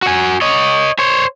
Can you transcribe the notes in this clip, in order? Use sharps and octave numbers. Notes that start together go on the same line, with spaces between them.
F#4 G#5
C#5 D#5
C5 C#5